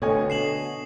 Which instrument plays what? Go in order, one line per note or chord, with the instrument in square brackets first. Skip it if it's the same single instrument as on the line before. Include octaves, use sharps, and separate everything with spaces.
[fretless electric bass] B2 D3 [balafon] A3 A4 [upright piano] C#5 D#5 G#5
[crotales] C7 E7 F#7